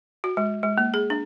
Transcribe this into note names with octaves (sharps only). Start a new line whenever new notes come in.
F#4
G#3
G#3
A#3
G#4
D4